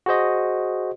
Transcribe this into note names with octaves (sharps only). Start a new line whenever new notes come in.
F#4 G#4 C5 D#5